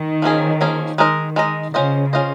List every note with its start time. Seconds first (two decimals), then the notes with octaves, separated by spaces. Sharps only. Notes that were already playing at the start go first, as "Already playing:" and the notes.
Already playing: D#3
0.22 F3 A#3 C#4 G#4
0.61 F3 A#3 C#4 G#4
0.98 D#3 G#3 D#4 A#4 D#5
1.36 G#3 D#4 A#4 D#5
1.74 C#3 C#4 F4 C5 D#5
2.13 C#4 F4 C5 D#5